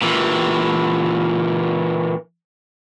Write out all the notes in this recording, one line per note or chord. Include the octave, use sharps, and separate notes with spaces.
A#2 E3